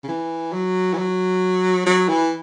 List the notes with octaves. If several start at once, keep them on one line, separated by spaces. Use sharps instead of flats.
C#3
E3
F#3
E3
F#3
F#3
E3